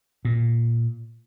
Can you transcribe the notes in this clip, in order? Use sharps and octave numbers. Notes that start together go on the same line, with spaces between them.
A#2